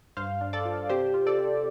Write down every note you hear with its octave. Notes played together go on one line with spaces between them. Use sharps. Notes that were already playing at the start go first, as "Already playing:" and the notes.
G2 C5 F5
D4
A4 D5
F4
C3 G4 C5
F4
A4 D5
C3